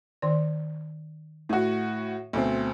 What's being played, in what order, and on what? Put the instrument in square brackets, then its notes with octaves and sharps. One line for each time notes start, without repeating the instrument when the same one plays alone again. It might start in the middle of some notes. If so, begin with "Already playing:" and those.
[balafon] D#3 D5
[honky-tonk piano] A2 F#4
D2 B2 C4